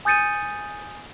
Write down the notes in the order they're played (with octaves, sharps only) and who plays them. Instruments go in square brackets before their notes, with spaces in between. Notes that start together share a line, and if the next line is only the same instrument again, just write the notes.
[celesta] G#5 D#6 G6 A6 C#7 D#7